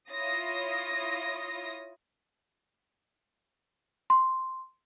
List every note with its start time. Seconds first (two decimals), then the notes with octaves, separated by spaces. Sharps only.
0.10 E4 F4 C#5 D#6 A#6
4.10 C6